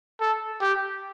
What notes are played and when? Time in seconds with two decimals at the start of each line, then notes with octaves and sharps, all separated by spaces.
0.20 A4
0.61 G4